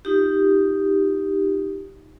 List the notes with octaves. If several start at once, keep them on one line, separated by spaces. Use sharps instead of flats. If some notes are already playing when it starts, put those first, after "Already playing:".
D#4 F4 G4